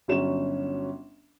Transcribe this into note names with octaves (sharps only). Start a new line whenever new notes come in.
G1 F#3 C#4 E7